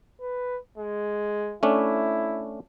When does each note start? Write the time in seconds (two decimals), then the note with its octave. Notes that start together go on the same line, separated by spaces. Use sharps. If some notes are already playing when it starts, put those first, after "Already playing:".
0.21 B4
0.78 G#3
1.63 A3 C#4 D4 E4